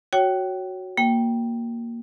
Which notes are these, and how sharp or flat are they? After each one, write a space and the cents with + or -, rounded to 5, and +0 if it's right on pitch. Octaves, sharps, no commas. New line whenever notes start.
F#4 +0 C#5 +0 G5 -25
A#3 +0 G5 +0